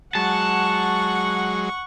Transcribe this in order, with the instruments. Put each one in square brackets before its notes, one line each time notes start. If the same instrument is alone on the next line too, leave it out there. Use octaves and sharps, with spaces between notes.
[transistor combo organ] F#3 G#3 [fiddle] F#5 C#6 [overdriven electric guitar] A5